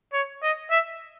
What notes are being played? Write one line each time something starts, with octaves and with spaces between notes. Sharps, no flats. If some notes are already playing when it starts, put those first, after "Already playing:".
C#5
D#5
E5